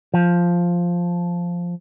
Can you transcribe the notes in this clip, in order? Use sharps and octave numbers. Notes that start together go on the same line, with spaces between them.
F3